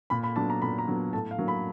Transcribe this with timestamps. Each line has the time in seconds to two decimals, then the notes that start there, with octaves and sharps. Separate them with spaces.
0.10 A#2 B5
0.23 B5
0.36 F#3 B3 D4 A5
0.50 A#5
0.62 A#2 B5
0.79 A#5
0.87 F#3 B3 D4
1.13 A2 A5
1.31 F5
1.38 F#3 A#3 D4
1.48 B5